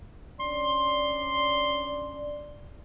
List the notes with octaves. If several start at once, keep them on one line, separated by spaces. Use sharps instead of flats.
C#4 D4 D5 C6